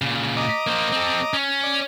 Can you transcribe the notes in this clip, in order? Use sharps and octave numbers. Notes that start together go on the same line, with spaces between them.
A#2 C#3
D#5 A#5 D6
A#3 C5
C4 A4
C#4
D5